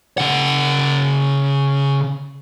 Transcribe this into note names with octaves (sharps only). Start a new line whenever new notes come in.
C#3 F#5